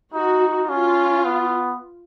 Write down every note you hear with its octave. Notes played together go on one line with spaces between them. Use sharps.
D#4 F#4
C#4 F4
B3